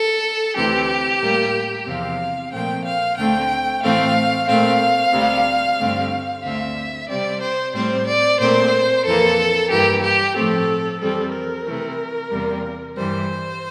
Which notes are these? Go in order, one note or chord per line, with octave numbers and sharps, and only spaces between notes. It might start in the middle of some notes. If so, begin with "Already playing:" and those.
Already playing: A4
D2 C3 E3 G4
A2 G3 A#3
E2 C3 F3 C4 F5
A#2 F3 A3 C4 G5
F5
D2 D3 A3 C4 G5
A2 E3 A3 C4 F5
A#2 A3 C4 F5
D2 C3 G3
G2 D3 A3 C4
D2 D3 A3 C4 E5
C3 G3 C4 D5
C5
A2 G3 C4 C5
D5
A#2 A3 C4 C5
F2 E3 A#3 A4
G2 E3 A#3 G4
G4
A2 F3 A3 C4 A4
F2 E3 G3 C4 A4
A#4
C3 E3 A3
E2 C3 G3 A#3
G2 E3 G3 C5